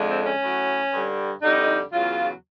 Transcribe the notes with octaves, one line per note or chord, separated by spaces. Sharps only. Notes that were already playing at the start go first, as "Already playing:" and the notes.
Already playing: F2 D3 F3 G#3
C4
C#4
A2 F#3
G2 D3 G3
F2 D3 G3 D#4
E2 C#3 F#3 F4